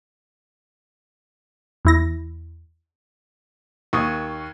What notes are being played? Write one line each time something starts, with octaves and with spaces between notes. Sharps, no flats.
E2 E4 A#6
D#2 C#6 D#6 G#6